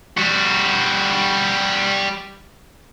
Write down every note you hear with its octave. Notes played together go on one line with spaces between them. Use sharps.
G3 F#4